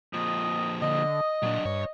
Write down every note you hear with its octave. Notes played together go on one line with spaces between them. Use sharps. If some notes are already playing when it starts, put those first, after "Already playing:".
F2 A#2 D#5
D3 D#5 D#6
A#2 F#3 D4
G2 C#5